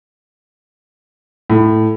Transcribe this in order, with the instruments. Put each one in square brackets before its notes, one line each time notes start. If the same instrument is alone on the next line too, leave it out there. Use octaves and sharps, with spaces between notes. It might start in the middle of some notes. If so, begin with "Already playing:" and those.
[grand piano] A2